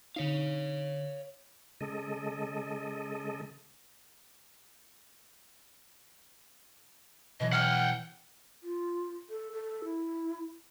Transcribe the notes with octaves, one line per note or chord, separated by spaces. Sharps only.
D3 D#4 C#5 F5
C#3 G#3 A4 D#5
B2 E3 F#3 D#5
F#5 G5 F6 G#6
F4
A4
A4
E4